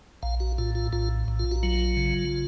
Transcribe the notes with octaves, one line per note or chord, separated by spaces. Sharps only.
A#1 F5
F#4
A2 F4
F4
A#1 F4
A#1
F4
F#4
F#3 F4
C#3